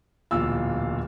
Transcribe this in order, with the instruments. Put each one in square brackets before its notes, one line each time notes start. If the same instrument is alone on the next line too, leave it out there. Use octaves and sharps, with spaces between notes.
[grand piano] D1 E2 A#2 F4 F5 E6